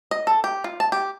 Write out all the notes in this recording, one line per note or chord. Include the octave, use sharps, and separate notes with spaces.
D#5
A4
G4
F4
A5
G4